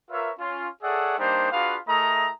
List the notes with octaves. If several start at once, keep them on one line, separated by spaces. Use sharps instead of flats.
F4 A#4 B4 C#5 E5
C#4 F4
G#4 A4 C#5 D5 E5 F#5
G3 A#3 D4 D#4 C5
D4 F4 F#4 G#4 B4 F5
A3 E4 G#4 A#4 D#5 A#5